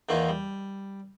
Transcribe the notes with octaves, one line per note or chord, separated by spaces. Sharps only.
E2 D#3 E3 A#3 D#4 F4
G3